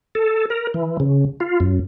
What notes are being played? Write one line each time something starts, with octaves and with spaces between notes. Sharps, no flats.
A4
A#4
E3
C#3
F4
F#2